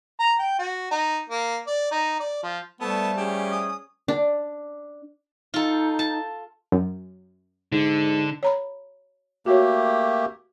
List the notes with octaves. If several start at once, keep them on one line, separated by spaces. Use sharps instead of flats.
A#5
G5
F#4
D#4
A#3
D5
D#4
D5
F3
F3 G3 A3 B3 A4 A5
C#4 G4 G#4
D#6
D4
D#4 F4 A4
A5
F#2
G#2 D3
C#5 A#5 B5
A3 A#3 F#4 G4 C#5